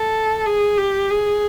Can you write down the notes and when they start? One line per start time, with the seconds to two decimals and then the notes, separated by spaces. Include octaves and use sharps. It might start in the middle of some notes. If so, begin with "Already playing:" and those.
Already playing: A4
0.46 G#4
0.77 G4
1.10 G#4